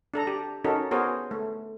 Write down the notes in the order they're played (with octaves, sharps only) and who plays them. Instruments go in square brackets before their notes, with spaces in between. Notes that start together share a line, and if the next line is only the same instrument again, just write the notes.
[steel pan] D4 A4 A#5
G4
C#4 D#4 F#4 A4 A#4
B3 F#4 G#4 A#4 C5 C#5
A3